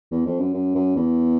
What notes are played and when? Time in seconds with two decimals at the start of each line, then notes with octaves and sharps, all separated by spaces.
0.11 E2
0.26 F2
0.40 F#2
0.54 F#2
0.75 F#2
0.96 E2